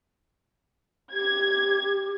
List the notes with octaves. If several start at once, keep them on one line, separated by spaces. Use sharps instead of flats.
G4 G#6